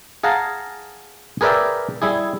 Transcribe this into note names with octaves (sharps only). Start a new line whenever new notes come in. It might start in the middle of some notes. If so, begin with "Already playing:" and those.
G#4 F5 F#5 A5 A#5
G#4 A#4 B4 D5 E5 G5
G3 E4 G#4